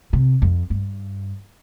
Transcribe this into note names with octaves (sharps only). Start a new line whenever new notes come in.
C3
F2
G2